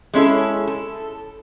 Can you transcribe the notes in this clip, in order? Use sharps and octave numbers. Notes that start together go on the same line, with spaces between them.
G#3 C#4 E4 A4
A4